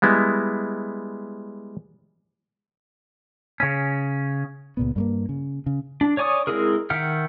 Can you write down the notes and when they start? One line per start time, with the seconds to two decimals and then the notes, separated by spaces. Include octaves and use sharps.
0.02 G3 G#3 B3 E4
3.60 C#3 C#4
4.77 C#2 A#2 B3
4.96 G2 A3 A#3
5.29 C#3
5.66 C#3
6.01 D4
6.17 C#5 D5 G#5 C#6 D#6
6.47 G#3 C4 E4 G#4 A#4
6.90 D#3 E5 F#5 G5 F6